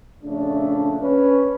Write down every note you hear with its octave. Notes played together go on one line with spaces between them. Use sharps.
A#1 C#3 A3 D4
C#4 B4